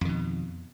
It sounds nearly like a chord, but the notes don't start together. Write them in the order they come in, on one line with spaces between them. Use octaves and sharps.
F2 D#3 B2